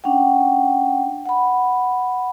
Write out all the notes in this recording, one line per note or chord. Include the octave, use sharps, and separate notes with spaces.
C#4 D4 F#5 G5
F#5 B5